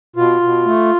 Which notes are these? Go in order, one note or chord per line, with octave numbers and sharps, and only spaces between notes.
B2 F4
B2
A3